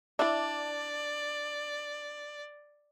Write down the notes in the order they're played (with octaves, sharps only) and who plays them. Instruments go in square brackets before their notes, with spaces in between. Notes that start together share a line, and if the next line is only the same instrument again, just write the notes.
[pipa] D4 [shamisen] E4 E5 [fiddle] D5